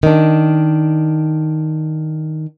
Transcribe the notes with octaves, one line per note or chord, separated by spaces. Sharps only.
D#3 D4